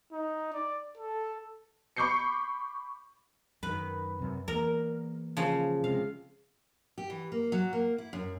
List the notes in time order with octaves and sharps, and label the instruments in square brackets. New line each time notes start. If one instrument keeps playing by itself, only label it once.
[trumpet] D#4
D5
A4
[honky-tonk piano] B5 C#6 D6 G6 C7 C#7
[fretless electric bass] F#2 D#3 [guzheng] B4
[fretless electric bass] F#2 C3
[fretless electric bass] E2 A#3 [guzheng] A#4
[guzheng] C#3 F3
[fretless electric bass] C3 G#3 [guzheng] F5
[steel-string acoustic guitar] G4
E3
A#3
F#3
A#3
E4
F#2